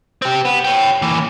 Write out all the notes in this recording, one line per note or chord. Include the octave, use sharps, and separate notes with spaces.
C4 G4
B3
C#5 G5
E3 A#3